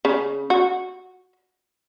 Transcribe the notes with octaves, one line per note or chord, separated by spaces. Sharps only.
C#3
F#4